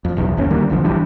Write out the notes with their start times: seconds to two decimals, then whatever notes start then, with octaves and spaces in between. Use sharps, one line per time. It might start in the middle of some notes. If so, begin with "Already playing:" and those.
0.05 F2
0.17 F#1 B1 E2
0.37 G1 D#2 C#4
0.50 D2 D#3 G3 A#3
0.70 E1 A#1 D3 F3
0.84 F#1 E3 G3 D4